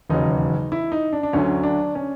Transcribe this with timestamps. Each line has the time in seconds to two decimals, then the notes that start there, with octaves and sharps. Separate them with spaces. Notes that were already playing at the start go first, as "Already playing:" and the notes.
0.10 E1 D#2 C#3 F#3 D#4
0.72 E4
0.92 D#4
1.13 D4
1.23 D4
1.33 D2 D3 F#3 C#4
1.63 D4
1.95 C#4